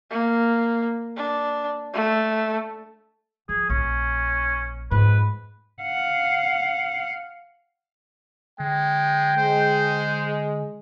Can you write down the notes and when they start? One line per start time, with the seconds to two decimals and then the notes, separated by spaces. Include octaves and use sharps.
0.10 A#3
1.16 D4
1.94 A3
3.49 F3 G#4
3.69 A#1 C#4
4.91 F2 G#2 B4
5.82 F5 F#5
8.60 D3 G#3 G5
9.38 G#3 C5